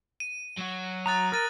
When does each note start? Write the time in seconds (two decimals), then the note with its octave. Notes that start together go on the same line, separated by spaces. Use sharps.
0.20 D#7
0.58 F#3 F#4
1.06 A#5 D#6 F#6 A6
1.32 A#4 F6 A6 D#7